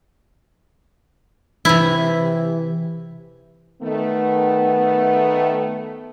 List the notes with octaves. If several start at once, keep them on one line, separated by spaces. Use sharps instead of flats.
C3 E3 E4
D#3 A3 B3